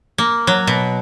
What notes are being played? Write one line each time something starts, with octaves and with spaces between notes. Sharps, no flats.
A#3
F#3
B2